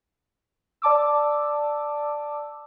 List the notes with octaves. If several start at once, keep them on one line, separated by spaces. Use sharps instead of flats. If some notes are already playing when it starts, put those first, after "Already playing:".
D5 A5 D6 E6